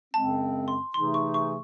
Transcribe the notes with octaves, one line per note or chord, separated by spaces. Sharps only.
F#2 C#3 G#3 C4 A5
C6
C3 E3 A3 D#4 G#4 C6
C#6
C#6